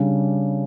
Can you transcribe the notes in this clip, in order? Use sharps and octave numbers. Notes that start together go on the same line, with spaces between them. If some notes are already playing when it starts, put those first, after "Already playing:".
Already playing: C#3 G3 D4